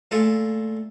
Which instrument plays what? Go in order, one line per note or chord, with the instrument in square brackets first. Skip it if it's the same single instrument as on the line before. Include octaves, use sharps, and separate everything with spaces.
[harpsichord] A#2 A3 F4 G#4 A4